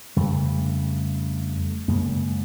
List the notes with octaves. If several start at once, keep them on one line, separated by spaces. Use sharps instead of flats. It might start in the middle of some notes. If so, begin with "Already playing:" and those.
F2 C#3 G3 A3
F#2 C#3 G#3 A#3